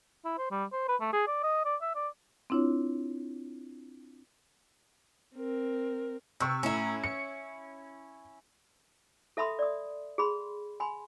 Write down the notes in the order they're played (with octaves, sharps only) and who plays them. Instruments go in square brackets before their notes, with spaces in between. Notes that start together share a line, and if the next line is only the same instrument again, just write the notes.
[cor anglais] E4
C5
G3
C5
B4
A3
G#4
D5
D#5
D5
E5
D5
[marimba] C4 D4 E4 F4 C#5
[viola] C4 A#4
[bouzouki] C3 [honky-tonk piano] C#6 E6
[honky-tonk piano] A2 A#5 [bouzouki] C#4 E4
[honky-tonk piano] C#7
[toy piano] A4 E5 A5 B5 C6 D#6
D5 D#6
G#4 B5 C6
G#5 B5 C6